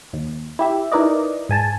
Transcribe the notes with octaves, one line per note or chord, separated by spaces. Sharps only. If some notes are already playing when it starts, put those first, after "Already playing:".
D#2
E4 G4 E5
D#4 E4 A#4 B4 D5 D#5
G#2 G#5 A5